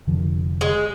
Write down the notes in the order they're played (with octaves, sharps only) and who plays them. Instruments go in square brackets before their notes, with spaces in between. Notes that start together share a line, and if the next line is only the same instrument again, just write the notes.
[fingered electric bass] F1 D3 F3
[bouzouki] G#3